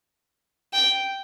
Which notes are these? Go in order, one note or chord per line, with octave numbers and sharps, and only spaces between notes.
G5